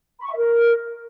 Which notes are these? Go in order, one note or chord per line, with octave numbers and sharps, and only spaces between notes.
B5
C#6
E5
A#4